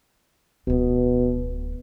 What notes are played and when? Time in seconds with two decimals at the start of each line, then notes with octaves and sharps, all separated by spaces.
0.67 D1 B2 B3